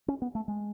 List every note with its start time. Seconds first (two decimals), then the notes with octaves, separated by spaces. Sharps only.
0.08 C#4
0.22 B3
0.35 A3
0.48 G#3